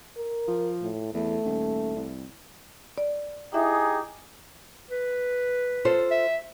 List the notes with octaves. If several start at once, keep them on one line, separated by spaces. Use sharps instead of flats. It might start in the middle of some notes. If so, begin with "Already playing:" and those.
A#4
F3
A2
E2 A3
D#1
C2
D5
D#4 E4 G4 G#4 E5
B4
F4 A4 C5
E5